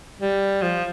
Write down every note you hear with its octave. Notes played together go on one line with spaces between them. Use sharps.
G3
F3